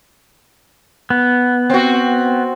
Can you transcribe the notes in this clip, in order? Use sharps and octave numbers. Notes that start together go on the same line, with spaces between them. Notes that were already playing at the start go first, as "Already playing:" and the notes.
B3
C4 F#4